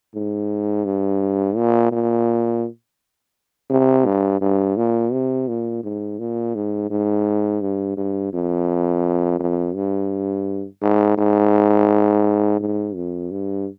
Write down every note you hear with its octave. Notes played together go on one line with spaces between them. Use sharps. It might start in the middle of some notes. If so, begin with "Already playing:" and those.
G#2
G2
A#2
A#2
C3
G2
G2
A#2
C3
A#2
G#2
A#2
G#2
G#2
G2
G2
F2
F2
G2
G#2
G#2
G#2
F2
G2